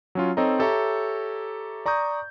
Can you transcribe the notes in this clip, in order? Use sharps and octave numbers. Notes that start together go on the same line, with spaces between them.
F#3 C#4 F4
C4 D#4 A4 C#5 D#5 A#5
G4 A4 C#5 E5 A#5 C#6
D5 A#5 C#6 D#6 G6